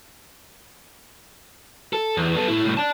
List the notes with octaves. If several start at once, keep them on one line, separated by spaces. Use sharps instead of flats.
A4
E2
B3 A4
A2 E4
C2 A2
D5 A5